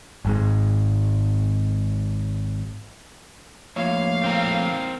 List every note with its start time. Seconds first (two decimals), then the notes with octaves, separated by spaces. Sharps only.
0.25 G#1 G#2 G#3
3.76 F2 A2 A#3 C#5 F5
4.24 C4 A#4